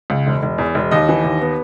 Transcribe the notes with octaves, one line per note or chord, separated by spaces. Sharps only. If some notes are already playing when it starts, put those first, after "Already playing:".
C#2
E1
E1
E2
E1
D#2 D#5
E3
D#2
B3